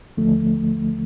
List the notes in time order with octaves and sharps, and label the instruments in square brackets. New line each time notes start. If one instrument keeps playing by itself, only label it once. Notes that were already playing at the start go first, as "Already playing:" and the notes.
[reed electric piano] D#2 D3 F3 A3